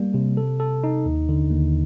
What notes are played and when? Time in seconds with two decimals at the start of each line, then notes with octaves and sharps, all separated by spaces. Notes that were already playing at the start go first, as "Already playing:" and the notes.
Already playing: G3 A#3
0.14 C3
0.37 A4
0.60 A4
0.84 D#4
1.05 D#2
1.29 D3
1.51 D#2